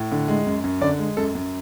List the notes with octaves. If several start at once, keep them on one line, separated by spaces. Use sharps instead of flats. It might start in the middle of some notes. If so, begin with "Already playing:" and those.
Already playing: A2
D3
G#3
F#2
F#2
D3 D5
G#3
F#2 A4
F#2